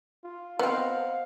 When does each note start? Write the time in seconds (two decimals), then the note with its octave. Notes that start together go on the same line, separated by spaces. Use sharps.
0.24 F4
0.59 B3 C4 C5 D#5 F5 F#5